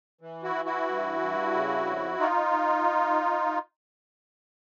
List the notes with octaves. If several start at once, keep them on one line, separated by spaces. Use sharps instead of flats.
E3
E4 F#4
E3
E4 F#4
G2
G2
C#3
F2
D#4 F4